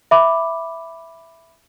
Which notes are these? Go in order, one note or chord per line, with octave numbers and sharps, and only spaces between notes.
E5 B5 D6